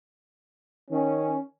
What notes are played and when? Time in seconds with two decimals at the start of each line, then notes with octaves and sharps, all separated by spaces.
0.91 D#3 C#4